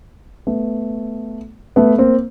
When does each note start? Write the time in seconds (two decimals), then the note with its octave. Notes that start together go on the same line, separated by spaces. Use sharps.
0.47 A3 B3
1.76 A3 B3
1.98 A#3 C4